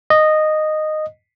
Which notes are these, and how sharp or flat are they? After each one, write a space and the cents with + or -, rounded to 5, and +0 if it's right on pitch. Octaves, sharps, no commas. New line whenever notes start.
D#5 -10